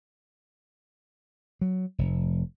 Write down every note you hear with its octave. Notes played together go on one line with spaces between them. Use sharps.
F#3
F1